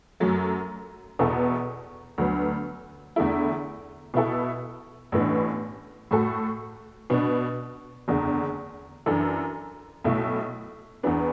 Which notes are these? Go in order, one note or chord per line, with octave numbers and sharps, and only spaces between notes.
F#2 F#3 A3
E2 B2 B3 E4 A4
D2 D3 F#3 B3
E2 D3 A3 E4
B2 B3 E4 A4
A1 A2 E3 B3 D4
A2 A3 F#4 A4
B2 B3 D4
F#1 E2 D3
F#2 E3 D4 A4
B1 B2 A3 E4
E2 E3 B3 D4